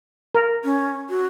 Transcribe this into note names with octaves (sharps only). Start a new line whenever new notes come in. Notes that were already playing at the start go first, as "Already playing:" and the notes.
A#4
C#4
F#4